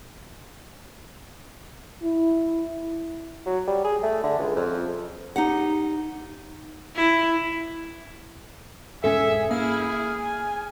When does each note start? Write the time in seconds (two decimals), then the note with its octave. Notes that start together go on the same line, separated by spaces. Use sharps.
2.03 E4
3.46 F#3
3.68 G3
3.84 G#4
4.03 A3
4.23 D3
4.39 C#2
4.56 F2
5.36 D#4 G4 F#5
6.96 E4
9.04 E1 G#2 C#4 G#4 A4 E5
9.51 A#3 E4 G#4 F6
10.20 G#5